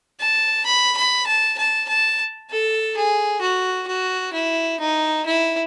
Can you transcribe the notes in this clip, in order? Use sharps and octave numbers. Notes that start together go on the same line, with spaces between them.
A5
B5
B5
A5
A5
A5
A4
G#4
F#4
F#4
E4
D#4
E4